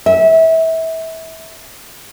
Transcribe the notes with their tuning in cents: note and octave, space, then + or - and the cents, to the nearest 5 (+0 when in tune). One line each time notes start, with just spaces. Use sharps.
E5 -25